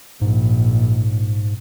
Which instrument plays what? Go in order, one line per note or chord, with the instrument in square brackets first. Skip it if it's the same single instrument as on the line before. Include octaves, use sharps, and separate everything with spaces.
[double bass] A#1 [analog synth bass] G#2